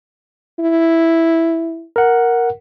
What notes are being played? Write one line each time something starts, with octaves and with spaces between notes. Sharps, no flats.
E4
A#4 F#5